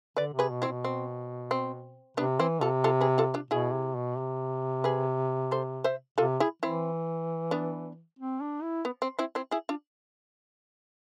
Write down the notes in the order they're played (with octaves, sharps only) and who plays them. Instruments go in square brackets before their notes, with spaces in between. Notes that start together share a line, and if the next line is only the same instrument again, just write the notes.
[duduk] D3 [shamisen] B4 D5
[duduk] C3
[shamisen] G#4 B4
[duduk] B2
[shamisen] C4 E4
[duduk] B2
[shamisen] C4
C4
[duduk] C3 [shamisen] B3 D4
[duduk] E3 [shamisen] C4 E4
[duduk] C3 [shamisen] F4 A4
[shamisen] F4 A4
G#4 B4
F4 A4
D4 F4
[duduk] B2 [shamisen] E4 G#4
[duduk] C3
B2
C3
[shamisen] G#4 B4
A4 C5
C5 E5
[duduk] C3 [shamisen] F4 A4
[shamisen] E4 G#4
[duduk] E3 [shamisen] C4 E4
[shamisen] B3 D4
[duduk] C4
D4
E4
[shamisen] B3
C4
C4 E4
C4 E4
E4 G#4
D4 F4